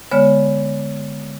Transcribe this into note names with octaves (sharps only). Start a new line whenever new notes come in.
D3 G#3 B3 C#5 F6